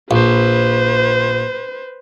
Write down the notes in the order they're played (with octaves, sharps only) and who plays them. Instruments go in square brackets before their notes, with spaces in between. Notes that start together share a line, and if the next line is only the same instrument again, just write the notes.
[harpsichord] A#1 [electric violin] B4 C5